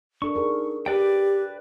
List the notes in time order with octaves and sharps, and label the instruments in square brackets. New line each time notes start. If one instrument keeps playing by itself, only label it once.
[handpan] D4 A4 A#4 [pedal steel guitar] C#6
[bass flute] D#4 [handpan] G#4 A#4
[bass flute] G4 [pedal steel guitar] B4 D5 G5